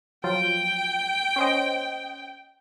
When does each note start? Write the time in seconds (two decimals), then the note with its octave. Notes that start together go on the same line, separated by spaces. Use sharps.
0.24 F3 F#3 F4 G5
1.36 C#4 C5 D#5